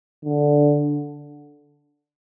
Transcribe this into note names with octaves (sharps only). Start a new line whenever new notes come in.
D3